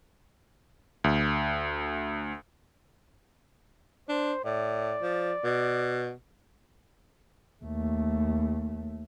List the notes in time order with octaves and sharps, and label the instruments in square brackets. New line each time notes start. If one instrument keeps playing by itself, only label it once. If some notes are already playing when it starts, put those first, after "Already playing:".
[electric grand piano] D2
[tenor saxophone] D4 [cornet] C5
[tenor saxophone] A2 [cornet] D5
[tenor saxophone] F3
B2
[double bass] D#2 A3